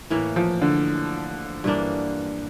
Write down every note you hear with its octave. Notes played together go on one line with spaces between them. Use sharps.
A2 E3 A#3
F3
D3
G2 E3 A#3 D4